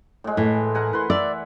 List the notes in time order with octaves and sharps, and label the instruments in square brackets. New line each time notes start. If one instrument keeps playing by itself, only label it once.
[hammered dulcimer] A2 G#3
[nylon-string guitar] A2 [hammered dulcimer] E3
[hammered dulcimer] A#4 F#5 G#5
B4 C6
[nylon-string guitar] D5 [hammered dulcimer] E5